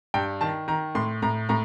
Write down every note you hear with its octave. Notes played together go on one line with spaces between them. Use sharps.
G2 G5
D#3 A5
D#3 A#5
A2 C6
A2 A#5
A2 A#5